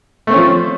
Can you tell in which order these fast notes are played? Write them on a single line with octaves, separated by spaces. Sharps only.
A3 C4 C#4 F3